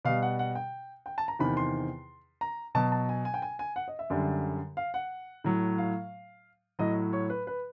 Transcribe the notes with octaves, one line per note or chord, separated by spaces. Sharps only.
B2 G3 F5
F#5
F#5
G5
G5
A5
A#5
E2 C3 D#3 B5
C6
A#5
B2 F#3 A5
A5
G#5
G#5
G5
G#5
G#5
F#5
D#5
E5
F#2 D3 G3
F5
F#5
A2 F#3
F5
A2 F#3 D#5
C#5
B4
B4